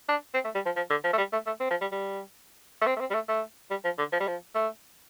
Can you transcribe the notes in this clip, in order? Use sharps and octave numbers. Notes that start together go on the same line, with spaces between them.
D4
C4
A3
G3
F3
F3
D3
F3
A3
G3
A3
A3
C4
F3
G3
G3
A3
C4
A3
C4
G3
A3
A3
G3
F3
D3
F3
G3
F3
A3